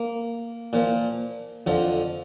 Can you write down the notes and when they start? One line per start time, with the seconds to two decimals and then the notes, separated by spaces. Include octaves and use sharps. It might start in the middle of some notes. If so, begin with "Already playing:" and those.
Already playing: A#3
0.73 A#2 F3
1.66 F2 D3 F3